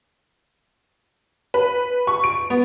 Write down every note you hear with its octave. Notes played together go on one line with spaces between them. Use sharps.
B4
C#6
D7
B3